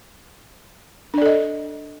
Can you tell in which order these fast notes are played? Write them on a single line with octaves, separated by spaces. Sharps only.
D4 D5 A4 D#5